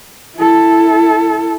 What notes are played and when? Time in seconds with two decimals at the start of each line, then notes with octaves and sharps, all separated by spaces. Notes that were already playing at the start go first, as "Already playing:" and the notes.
0.36 E4 A4